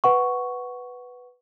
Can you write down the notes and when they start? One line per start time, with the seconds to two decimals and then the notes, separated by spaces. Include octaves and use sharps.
0.04 B4 F#5 C#6